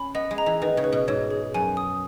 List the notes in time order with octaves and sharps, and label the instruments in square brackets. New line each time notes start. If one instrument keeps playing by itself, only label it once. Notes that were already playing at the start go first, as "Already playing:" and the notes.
Already playing: [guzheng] C#4 [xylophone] B5
[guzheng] B3 [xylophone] D#5
[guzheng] G#3
[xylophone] A#5
[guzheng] E3
[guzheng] D#3 [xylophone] B4
[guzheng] C#3
[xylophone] B4
[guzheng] B2
[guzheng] G#2 [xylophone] C#5
[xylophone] G#4
[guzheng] F#2 [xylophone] G#5
[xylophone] D#6